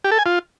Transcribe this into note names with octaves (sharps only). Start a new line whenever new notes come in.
G4
A4
G#5
F4